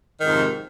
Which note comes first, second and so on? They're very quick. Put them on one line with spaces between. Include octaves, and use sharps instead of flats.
D#3 G#2 F2 C3